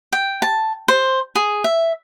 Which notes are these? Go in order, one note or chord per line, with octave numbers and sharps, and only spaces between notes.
G5
A5
C5
G#4
E5